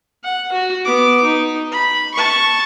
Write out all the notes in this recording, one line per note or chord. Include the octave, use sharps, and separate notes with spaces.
F#5
F#4
B3 D6
D#4
B5
A5 C#6